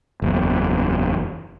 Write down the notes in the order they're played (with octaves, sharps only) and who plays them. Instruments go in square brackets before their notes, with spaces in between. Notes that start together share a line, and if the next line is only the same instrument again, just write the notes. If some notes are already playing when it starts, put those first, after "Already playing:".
[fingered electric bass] F#1 E2